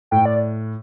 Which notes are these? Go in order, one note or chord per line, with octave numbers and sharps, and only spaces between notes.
A2 G5
D5